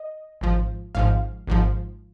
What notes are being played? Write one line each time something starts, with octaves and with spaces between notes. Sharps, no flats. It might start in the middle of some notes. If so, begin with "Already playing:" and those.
Already playing: D#5
G#1 G#2 F3
G#1 G#2 F3 F5
G#1 G#2 F3